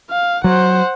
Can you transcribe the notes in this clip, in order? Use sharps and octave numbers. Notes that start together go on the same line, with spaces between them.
F5
F#3 C5 F#5